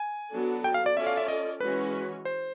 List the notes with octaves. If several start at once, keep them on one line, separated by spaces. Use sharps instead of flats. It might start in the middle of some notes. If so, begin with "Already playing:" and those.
Already playing: G#5
F#3 B3 D4 F#4 A4
G5
F5
D5
C#4 F4 A4 D5 E5
F5
E5
D#5
E3 G#3 C#4 F#4 B4
C5